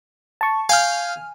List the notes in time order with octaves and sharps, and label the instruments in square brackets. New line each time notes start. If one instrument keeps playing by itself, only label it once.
[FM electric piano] A5 C#6
[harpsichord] F5 G5 [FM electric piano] G#5 F6